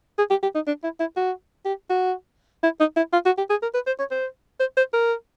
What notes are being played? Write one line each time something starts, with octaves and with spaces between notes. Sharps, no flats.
G#4
G4
G4
D#4
D4
E4
E4
F#4
G4
F#4
E4
D#4
E4
F4
F#4
G4
G#4
A#4
B4
C5
C#5
C5
C5
C5
A#4